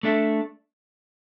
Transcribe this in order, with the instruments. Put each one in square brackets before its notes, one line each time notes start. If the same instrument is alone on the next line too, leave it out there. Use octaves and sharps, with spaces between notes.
[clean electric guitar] A3 D4 A4 E5